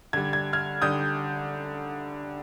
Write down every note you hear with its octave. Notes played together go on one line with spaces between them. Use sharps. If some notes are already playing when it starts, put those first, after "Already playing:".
D3 G3 G#6
G#6
F6 G#6
D3 G3 D#6 G6